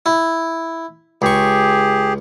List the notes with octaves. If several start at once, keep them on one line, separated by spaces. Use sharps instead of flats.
E4
C#2 G4 G#4 C#6